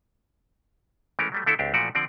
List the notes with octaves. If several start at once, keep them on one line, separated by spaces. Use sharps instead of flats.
E3 G#3 A3 C#4 A#4
F#3 G3 A3
D3 A3 D4 E4 F4 A4
C#2 C4 D4 G4
A#2 E3 F3 A3 F#4 D5
D3 F3 C4 D5